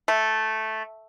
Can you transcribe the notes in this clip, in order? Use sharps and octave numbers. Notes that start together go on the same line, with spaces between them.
A3